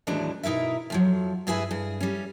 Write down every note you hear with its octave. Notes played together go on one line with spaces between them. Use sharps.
D#2 A2 E3 F#3 G#3 D4
B2 D#4 E4 A#4 E5
F2 F3 F#3
G2 E4 G#4 B4 E5 G#5
G2 G#4
G3 C#4